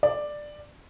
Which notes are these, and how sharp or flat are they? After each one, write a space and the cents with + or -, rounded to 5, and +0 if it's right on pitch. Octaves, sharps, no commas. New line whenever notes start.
D5 +10